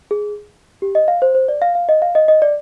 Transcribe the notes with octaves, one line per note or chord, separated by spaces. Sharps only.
G#4
G4
D#5
F5
C5
C5
D5
F5
F5
D#5
F5
D#5
D#5
D5